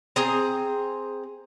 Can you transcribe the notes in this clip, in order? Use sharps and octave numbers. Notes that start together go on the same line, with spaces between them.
C4 G#4 A#5